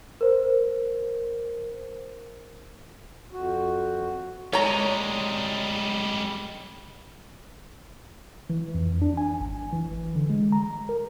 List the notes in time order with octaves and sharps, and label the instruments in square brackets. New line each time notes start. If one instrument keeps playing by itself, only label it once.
[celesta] A#4 C5
[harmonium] F2 F#4
[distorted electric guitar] G3 G#3 [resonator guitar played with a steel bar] C#5 A#5
[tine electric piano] E3
F2
D4
G#5
G#1
E3
D3
G#3
A#5
A#4